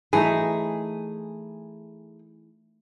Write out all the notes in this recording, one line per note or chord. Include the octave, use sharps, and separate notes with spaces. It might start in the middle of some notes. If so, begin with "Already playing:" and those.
E3 A3 D#4 G#4